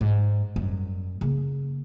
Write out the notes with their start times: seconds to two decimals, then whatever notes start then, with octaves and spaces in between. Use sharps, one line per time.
0.01 G#2
0.56 F#2 G3
1.21 C#3 A#3